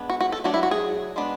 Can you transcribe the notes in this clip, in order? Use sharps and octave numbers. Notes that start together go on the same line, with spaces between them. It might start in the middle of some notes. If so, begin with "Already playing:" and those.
Already playing: G#3 B3 D4
F#4
F#4
A4
F#3 A3 D4 F#4
E4
F#4
G#4
G#3 B3 D4